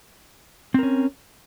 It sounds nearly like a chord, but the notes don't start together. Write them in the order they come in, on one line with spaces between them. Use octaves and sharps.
C4 A#4 C#4